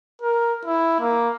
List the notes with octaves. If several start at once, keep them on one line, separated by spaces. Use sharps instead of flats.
A#4
E4
A#3